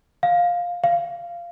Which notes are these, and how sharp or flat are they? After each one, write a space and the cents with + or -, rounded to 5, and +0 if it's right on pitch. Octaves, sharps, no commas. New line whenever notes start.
F5 +10
F5 -15